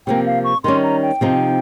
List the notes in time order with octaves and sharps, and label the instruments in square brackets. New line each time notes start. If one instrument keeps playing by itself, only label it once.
[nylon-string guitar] C3 F3 A#3 [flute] G5
[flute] F5
C#6
[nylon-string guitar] D#3 G3 C#4 [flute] C6
[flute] A#5
G5
[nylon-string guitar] C3 F3 C4 D#4